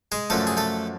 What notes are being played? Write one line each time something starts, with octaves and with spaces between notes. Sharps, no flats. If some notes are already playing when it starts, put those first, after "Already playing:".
G#3 G#4
F#2 D3 F3 A3 A4
G#4
A3 A4